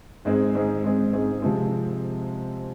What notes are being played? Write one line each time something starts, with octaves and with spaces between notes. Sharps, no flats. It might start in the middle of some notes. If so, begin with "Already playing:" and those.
G#2 G#3 C4 G#4
G#2 G#3 C4 G#4
G#2 G#3 C4 G#4
G#2 G#3 C4 G#4
C3 F3 G#3 C4